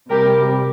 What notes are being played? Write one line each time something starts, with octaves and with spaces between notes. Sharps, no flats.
C3 G3 G4 A#4